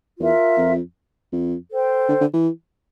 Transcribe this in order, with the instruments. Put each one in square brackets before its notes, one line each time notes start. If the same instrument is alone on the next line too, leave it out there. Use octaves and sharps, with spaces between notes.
[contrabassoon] E2 [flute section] F4 A#4 E5
[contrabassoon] F2
F2
[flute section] A4 C5 G5
[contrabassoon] D3
D3
E3